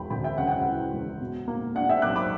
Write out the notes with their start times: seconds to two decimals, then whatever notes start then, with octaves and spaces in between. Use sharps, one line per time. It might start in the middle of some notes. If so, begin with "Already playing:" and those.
Already playing: E1 G5 B5
0.10 D2 G5 B5
0.24 E5 G5
0.38 C#3 F#5
0.47 G5
0.51 F#5
0.66 E3
0.93 E1
1.20 B2
1.48 A#3
1.75 D4 F#5
1.89 E5 G5
2.02 B1 D6 F#6
2.16 B5 D6